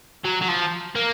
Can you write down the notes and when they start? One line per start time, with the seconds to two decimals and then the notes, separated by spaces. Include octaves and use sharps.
0.24 F#3
0.42 F#3
0.48 F3
0.96 A#3